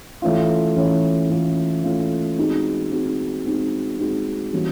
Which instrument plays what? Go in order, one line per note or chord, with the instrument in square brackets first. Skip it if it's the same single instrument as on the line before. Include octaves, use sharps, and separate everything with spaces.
[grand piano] E3 A3 C#4 F4
E3 A3 C#4 F4
E3 A3 C#4 F4
E3 A3 C#4 F4
G#3 C4 D#4 F#4
G#3 C4 D#4 F#4
G#3 C4 D#4 F#4
G#3 C4 D#4 F#4
E3 G3 A#3 C#4 F#4